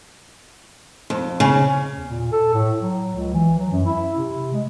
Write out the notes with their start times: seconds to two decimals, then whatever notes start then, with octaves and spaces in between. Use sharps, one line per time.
1.10 F2
1.40 C#3
1.97 E2
2.10 A#2
2.32 A4
2.54 A2
2.81 F#3
3.16 C#2
3.34 E3
3.59 F#3
3.72 F#2
3.86 E4
4.17 C3
4.53 G#3